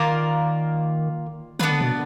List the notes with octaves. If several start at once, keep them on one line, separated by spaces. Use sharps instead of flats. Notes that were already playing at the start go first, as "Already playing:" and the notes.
Already playing: D#3 A#3 F4 A#4 D5
D#3 B3 D4 F4 B4
D3
B2